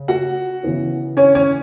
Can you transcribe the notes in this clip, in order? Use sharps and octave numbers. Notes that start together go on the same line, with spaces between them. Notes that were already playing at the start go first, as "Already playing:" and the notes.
Already playing: C#3
F#4 F#5
C#3 E3 B3
C#4 C#5
C#4 C#5